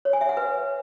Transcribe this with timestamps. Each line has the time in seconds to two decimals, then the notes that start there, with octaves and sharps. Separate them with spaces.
0.05 C#5
0.13 G#5
0.21 E5
0.29 F#5
0.37 B4